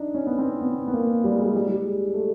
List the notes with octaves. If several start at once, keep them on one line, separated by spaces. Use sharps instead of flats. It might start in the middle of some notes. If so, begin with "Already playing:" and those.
Already playing: D4 D#4
C#4
B3
C4
B3
B3
A#3
G3
G#3
G3
G3
G3
G#3
A3